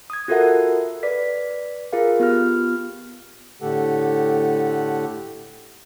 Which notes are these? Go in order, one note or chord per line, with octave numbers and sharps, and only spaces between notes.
D#6 G#6
F4 F#4 A4 A#4 E5 F#5
B4 D5 B6
F4 G#4 A#4 F5
B3 F4 G4 F6
A2 D3 A3 G4 A4 F#5